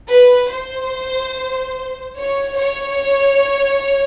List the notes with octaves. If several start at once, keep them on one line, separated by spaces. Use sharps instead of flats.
B4
C5
C#5
C#5